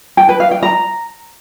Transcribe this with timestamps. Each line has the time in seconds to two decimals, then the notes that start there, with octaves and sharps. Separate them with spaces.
0.17 G5
0.29 B4
0.40 F5
0.51 G5
0.63 A#5